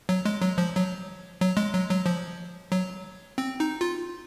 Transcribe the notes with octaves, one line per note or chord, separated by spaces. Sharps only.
F#3
G#3
F#3
F3
F#3
F#3
G#3
F#3
F#3
F3
F#3
C4
D#4
F4